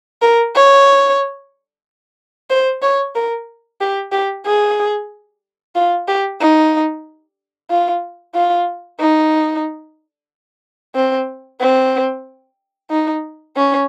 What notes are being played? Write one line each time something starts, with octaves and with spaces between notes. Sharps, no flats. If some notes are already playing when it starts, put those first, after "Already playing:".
A#4
C#5
C5
C#5
A#4
G4
G4
G#4
F4
G4
D#4
F4
F4
D#4
C4
C4
D#4
C#4